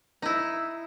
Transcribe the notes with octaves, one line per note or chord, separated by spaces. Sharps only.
D#4 E4